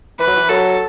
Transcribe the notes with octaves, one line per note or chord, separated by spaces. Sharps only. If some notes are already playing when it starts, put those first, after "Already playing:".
E3 B4
F#3
E3
F#3 A4